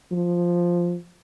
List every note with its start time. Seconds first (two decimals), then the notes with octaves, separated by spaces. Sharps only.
0.12 F3